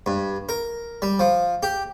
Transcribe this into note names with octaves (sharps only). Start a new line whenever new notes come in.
G2
A#4
G3
F3
G4